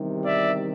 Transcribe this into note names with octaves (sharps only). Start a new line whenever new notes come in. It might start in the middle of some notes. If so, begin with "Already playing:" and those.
Already playing: E2 C3 D#3 G3
D5 E5